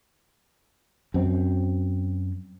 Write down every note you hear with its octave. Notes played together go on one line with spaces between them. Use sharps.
F#2 C4